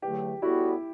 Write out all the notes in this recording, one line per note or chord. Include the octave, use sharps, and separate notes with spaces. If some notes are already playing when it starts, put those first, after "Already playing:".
E2 D3 F#3 A3 G4
A2 G3 B3 E4 F#4